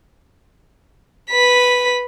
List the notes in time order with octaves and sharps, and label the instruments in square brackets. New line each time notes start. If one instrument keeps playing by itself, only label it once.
[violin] B4 B6